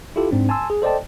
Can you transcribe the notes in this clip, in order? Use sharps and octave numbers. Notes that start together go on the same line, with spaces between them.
E4 F4 G4 A4
G#2 C4 D4
G#5 A5 C6 E6
G#4
A4 C5 D5 D#5 G5 A5